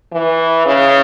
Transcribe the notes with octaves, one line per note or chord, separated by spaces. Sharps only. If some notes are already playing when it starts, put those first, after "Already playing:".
E3
C#3